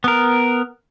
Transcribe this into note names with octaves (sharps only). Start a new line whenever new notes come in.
B3 A#4